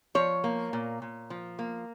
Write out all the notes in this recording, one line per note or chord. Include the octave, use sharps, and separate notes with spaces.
F3 C#5
A#3
A#2
A#2
F3
A#3